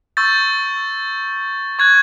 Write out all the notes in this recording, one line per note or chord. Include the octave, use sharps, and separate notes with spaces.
C#6 E6 G6 A6
C#6 F#6 G#6